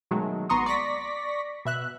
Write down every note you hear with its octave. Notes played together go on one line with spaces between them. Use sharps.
B2 D#3 F#3 G#3 A3
G#1 B3 A#5 C6 C#6 D#6
D5 C#6 A#6 B6
B2 E5 F#6